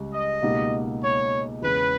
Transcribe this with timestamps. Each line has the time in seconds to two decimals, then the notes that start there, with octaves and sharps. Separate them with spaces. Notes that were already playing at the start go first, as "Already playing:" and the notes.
Already playing: C#2 C#3 G3
0.12 D#5
0.42 C#2 B2 A#3 D#4 G4
1.02 C#5
1.62 E2 C#3 G#3 B4